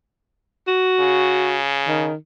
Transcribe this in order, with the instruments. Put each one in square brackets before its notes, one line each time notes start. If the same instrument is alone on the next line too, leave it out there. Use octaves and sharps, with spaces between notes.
[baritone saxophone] F#4
[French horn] C#3
[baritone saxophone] D#3